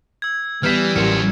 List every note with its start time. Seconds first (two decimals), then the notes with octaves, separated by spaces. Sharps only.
0.22 E6 G#6
0.63 E3 G3 B3 F6 G6 B6 E7
0.96 A1 F#3 F4 A#4 F6 C#7